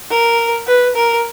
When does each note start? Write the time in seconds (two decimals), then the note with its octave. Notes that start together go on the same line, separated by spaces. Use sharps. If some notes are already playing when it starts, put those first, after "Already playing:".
0.11 A#4
0.67 B4
0.96 A#4